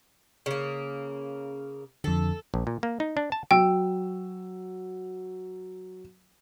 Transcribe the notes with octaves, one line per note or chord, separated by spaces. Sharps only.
C#3 A#3
F2 D3 A4
A#1
A#2
A#3
D#4
D4
A5
F#3 G5 E6